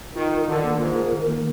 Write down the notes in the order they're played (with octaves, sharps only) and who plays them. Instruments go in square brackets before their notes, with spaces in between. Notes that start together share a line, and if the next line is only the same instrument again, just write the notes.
[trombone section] D#3 [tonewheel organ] F4
[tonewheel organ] A#4
[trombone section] D3 [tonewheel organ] D#3
[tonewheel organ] A#3
[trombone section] G#2 [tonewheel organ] F4
[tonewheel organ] A#4
D#3
A#3